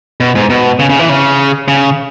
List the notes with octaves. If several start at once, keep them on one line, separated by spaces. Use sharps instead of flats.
B2
G#2
B2
C#3
C#3
E3
C#3
C#3